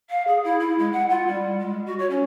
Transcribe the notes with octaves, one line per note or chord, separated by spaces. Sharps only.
F5
G#4
E4
E4
G#3
F#5
F4
G3
G#3
F#4
C#5
C#4